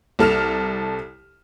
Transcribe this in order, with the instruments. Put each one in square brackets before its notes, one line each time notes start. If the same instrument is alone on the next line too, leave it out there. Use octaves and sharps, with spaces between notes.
[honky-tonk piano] C2 A4 F6 E7